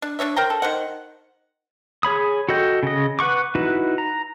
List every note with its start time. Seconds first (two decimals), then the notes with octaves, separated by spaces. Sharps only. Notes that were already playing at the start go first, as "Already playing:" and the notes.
0.02 D4
0.19 D4 D#4 C#5 E5
0.36 A#4 C5 G5 A#5
0.50 A4
0.62 D#3 C5 F#5
2.03 G#4 C#5 B5 D#6
2.49 F#4 A4 D#5 G5
2.83 C#3 D#5
3.19 B4 F#5 C#6 D6
3.55 D#4 E4 F#4 B4
3.98 A#5